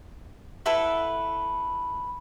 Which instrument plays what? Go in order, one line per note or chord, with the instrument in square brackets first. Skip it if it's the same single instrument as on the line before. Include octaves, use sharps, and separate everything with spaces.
[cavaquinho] E4 A4 B4 F#5